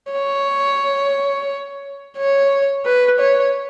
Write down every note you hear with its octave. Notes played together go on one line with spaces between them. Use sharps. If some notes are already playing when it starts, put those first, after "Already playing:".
C#5
C#5
B4
C#5